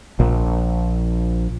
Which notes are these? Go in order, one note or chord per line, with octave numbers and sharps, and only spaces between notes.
A#1